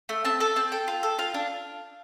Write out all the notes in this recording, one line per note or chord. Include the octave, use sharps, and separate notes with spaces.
A3
C4 A5
A4 A5
C4 A5
A4 G5
F4
A4
F4 F5
D4